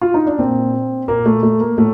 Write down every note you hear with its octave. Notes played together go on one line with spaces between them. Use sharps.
F4
D#4
D4
A#2 C4
A#2 A#3
A3
A3
A#3
A2 A3